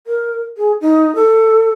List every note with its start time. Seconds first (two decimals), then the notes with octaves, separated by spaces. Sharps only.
0.07 A#4
0.57 G#4
0.81 D#4
1.15 A4